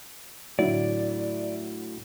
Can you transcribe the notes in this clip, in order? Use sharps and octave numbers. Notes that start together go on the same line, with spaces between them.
A2 D3 F#3 A3 E4 F#4 D5